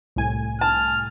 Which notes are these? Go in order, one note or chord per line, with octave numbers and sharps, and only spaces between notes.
C2 A2 G#5
A5 F6